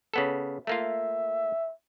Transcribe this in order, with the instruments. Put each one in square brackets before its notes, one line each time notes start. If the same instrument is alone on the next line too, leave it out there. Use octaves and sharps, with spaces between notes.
[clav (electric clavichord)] C#3 B3 A4
[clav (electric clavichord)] A3 A#3 F4 [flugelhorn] E5